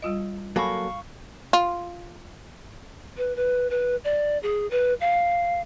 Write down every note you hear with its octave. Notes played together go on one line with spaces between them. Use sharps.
G3 F4 D#5
F#3 A#3 A4 F5 G#5 B5 C#6
F4
B4
B4
B4
D5
G#4
B4
F5